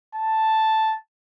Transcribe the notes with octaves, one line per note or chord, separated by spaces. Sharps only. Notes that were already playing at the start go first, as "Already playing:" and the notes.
A5